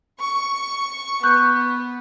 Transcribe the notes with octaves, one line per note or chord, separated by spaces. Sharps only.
C#6
B3 C#6 F#6 G6